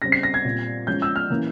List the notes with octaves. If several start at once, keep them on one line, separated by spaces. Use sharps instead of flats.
C#3 G3 C4 A#6
C7
A#6
G#6
A#2 G3 C4
F3 G#3 C#4 G6
E6
F6
E3 A#3 C#4